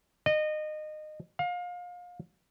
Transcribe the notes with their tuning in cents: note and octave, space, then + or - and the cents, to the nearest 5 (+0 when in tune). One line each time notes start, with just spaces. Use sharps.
D#5 -25
F5 +30